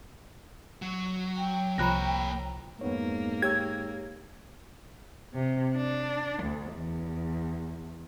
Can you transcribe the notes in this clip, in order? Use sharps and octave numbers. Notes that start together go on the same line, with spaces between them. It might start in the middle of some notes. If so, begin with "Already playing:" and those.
F#3
G5
C2 F3 A#3 C#5 A#5 B5 F#6 A#6
F2 G#2 A#3 B3 C#5
G4 C#5 E6 G#6
C3
D4
D2
E2